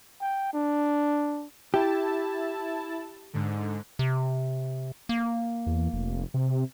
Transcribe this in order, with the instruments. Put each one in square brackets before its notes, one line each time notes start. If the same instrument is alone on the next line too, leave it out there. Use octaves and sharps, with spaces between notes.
[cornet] G5
D4
[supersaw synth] E4 A5 [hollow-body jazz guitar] G4
[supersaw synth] G#2 D3
[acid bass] C3
A#3
[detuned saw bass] E2
F1
C3